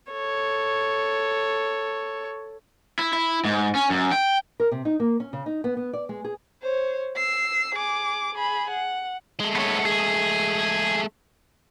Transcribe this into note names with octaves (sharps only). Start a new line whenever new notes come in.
A4 C#5
E4
E4
G#2
C#4
F#2
G5
A#4
C3
D#4
A#3
C#4
C#3
D#4
B3
B3
D5
G#3
G#4
C5 C#5
E6 C7
G#4 D6
G#4 B5
F#5
G#3 A3
B3 C#5
G#4